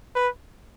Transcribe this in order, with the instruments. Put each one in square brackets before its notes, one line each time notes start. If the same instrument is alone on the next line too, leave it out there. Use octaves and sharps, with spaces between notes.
[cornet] B4